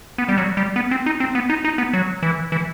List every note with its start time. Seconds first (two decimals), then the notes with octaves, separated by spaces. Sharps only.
0.18 B3
0.29 G3
0.38 F#3
0.57 G3
0.76 B3
0.91 C4
1.06 D#4
1.20 C4
1.35 B3
1.50 D#4
1.65 D#4
1.78 B3
1.93 F#3
2.23 E3
2.52 E3